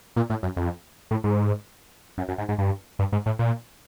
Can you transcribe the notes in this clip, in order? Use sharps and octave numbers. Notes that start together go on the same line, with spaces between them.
A#2
A2
F#2
F2
A2
G#2
F#2
F#2
G#2
G#2
G2
G2
G#2
A2
A#2